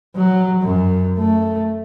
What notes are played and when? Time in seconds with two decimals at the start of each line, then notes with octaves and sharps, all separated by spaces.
0.16 F#3
0.62 F#2
1.18 A3